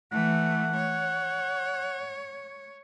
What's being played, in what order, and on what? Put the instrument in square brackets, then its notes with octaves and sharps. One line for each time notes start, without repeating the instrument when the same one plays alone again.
[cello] E3 A3 [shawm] F#5
[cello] C#5